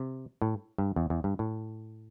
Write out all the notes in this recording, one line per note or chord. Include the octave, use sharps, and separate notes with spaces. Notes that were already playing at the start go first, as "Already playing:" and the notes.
Already playing: C3
A2
G2
E2
E2
G2
A2